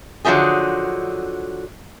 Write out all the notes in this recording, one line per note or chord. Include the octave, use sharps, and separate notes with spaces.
D3 F3 F#3 A3 D#4 G#4